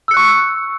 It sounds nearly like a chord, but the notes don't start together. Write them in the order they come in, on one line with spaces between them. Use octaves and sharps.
E6 C#7 F#6 C#6